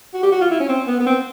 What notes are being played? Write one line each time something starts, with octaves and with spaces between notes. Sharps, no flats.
F#4
G4
F#4
F4
E4
C#4
C4
B3
B3
C4